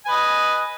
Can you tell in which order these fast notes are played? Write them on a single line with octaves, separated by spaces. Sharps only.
G#5 B4 D#5